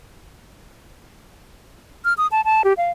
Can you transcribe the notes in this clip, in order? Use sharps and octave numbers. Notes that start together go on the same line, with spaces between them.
F6
D#6
A5
A5
G4
F5